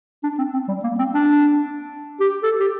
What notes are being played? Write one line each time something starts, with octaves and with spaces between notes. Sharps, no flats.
D4
C4
C4
G3
A#3
C4
D4
G4
A4
G4